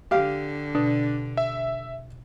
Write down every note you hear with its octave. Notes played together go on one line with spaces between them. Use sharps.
D3 G4 F5
B2 D4
E5